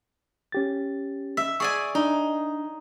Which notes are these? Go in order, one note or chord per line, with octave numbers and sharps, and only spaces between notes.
C#4 G4 A6
E5
G#4 D5 G#5 C#6
D4 D#4